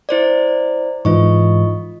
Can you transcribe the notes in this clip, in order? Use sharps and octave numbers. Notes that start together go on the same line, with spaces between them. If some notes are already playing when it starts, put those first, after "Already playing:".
E4 C5 D5
G#2 E3 F4 D#5 C#6